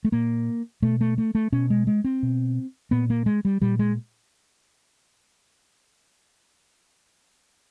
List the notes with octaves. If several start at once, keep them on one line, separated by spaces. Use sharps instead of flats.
A3
A#2 A#3
B2 A3
A3
A3
A3
B2 C#4
G#3
G#3
C4
B2
A#2 B3
A#3
G#3
G3
A#2 G3
G#3